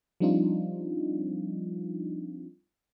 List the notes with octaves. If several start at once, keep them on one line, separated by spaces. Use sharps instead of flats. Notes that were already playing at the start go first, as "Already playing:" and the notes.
F3 G3 C4 D4 D#4 F4